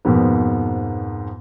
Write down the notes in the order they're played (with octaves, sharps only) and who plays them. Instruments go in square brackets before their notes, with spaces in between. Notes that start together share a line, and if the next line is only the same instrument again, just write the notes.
[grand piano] F2 G#2 B2 F3 A#3 B3